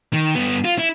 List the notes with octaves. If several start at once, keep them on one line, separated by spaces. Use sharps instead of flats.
D#3
G2 B3
F4
E4